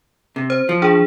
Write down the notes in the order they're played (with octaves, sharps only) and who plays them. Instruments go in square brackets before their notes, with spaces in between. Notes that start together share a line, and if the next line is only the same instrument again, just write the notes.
[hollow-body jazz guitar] C3
[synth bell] C5
[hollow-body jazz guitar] F3
[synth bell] D4 G#4